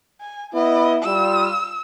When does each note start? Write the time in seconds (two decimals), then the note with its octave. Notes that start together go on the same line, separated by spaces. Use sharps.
0.21 G#5
0.53 B3 E4 D#5
1.03 G3 F4 E6